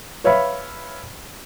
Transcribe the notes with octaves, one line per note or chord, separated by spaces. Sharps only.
B4 C#5 E5 F5 B5